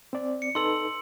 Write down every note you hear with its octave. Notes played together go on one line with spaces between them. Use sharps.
C4 D5
C#7
D#4 A4 B4 C6 E6 F#7